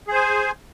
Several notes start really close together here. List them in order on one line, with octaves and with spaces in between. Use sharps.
G#4 C5 G#5